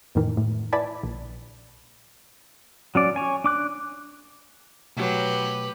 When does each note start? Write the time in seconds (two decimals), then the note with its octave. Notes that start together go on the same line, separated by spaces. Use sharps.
0.15 F2 A2 D#3 E3
0.37 A2
0.73 E4 B4 D5 G#5 A5 B5
1.03 A#1
2.95 F#3 C#4 D5
3.16 C#5 G#5
3.44 D4 D6 F#6
4.97 B2 F#3 A3 G4 B4